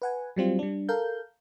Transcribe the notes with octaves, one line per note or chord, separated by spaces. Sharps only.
B4 F#5 G#5
F#3 G3 C4 F4
G3 D4
A4 A#4 F5 G6